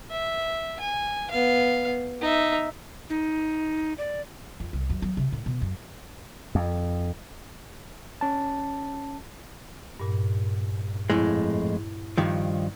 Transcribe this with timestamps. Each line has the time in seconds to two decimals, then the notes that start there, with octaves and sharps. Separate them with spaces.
0.10 E5
0.80 G#5
1.31 B3 F5
2.21 D#4 E5
3.10 D#4
3.98 D5
4.60 F2
4.73 C2
4.90 F#2
5.02 F#3
5.17 C3
5.32 A2
5.46 B2
5.62 F#2
6.55 F2
8.21 C#4 A5
10.00 G2 A#2
11.10 F2 A2 G#3 E4
12.17 G2 D#3 F3